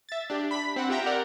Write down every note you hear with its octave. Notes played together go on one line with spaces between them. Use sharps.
E5 A6
D4 G4
B5 B6
C4 F#5
F4 G4 E5 G5 A#5
G4 A#4 D5 F#5